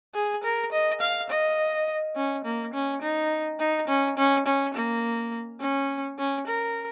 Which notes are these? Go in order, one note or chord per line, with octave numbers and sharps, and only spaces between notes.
G#4
A#4
D#5
F5
D#5
C#4
A#3
C#4
D#4
D#4
C#4
C#4
C#4
A#3
C#4
C#4
A#4